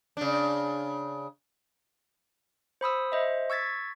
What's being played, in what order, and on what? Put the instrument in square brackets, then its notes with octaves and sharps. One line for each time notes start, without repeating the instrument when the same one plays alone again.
[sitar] C#3 D4
[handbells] C5 B5 D#6 E6
C5 D#5 E5
C#6 E6 G#6 A6 B6